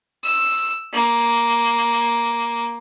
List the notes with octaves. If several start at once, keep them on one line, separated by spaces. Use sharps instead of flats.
E6
A#3